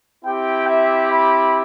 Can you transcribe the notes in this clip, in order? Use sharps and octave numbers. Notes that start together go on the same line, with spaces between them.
C4 E4 G4 G5
E5
B5